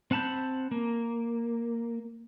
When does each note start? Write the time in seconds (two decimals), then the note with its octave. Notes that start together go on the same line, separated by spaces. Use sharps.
0.11 C4 F#5 A5 B5 G6
0.71 A#3